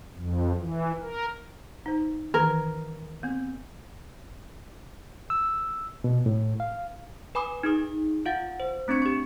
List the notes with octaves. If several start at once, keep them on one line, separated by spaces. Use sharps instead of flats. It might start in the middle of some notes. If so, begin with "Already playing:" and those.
F2
E3
A#4
D#4 C5
D#3 E3 A#4
B3 C4
E6
B2
A2
F5
B4 G#5 B5 D6 D#6
D#4 G#4 D#6
F4 F5 F#5 A6
C5
A3 C4 D4 C#6 C#7
G4 C#6